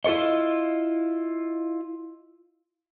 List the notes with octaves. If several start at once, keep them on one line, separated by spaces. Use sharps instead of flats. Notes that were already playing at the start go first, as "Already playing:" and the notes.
E4 F4 A4 C#5 D#5